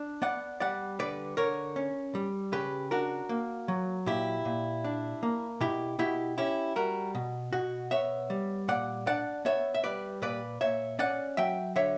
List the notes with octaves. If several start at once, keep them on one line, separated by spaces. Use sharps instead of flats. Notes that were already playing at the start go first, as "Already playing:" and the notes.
Already playing: D4
B3 D5 F#5
G3 D5 F#5
D3 B4 D5
D3 A#4 C#5
C#4
G3
C#3 G4 B4
D4 F#4 A#4
A#3
F#3
A#2 E4 G4
A#2
D4
A#3
B2 E4 G4
B2 E4 G4
C#4 E4 G4
G3 F#4 A#4
B2
B2 F#4
B3 C#5 E5
G3
A#2 D5 F#5
D4 D5 F#5
B3 C#5 E5
E5
G3 B4 D5
A#2 B4 D5
A#2 C#5 E5
C#4 D5 F#5
F#3 E5 G5
D3 C#5 E5